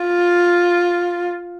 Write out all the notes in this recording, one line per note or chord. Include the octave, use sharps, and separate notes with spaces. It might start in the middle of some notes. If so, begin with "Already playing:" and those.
Already playing: F4